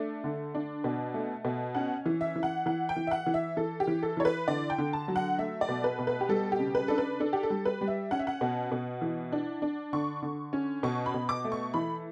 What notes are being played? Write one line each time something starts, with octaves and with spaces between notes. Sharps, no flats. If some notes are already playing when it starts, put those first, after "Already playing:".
Already playing: A3 D4
D3
D4
B2
A3
B2
C#4 F#5
E3
E5
E3
F#5
E3 F#5
G5
E3
E5
F#5
E3
E5
E3 A4
G4
E3
A4
E3 C#5
B4
D3 D5
G5
D3
A5
F#3
F#5
A3 E5
D5
B2
B4
B2
B4
G4
G3 A4
G4
C#3
B4
D4 A4
B4
D4 A4
G4
A4
G3
B4
G3
E5
C#4 F#5
E5
F#5
B2
B2
E3
D4
D4
D3 C#6
D3
C#4
B2 C#6
B5
B2
D6
A3
C#6
E3 B5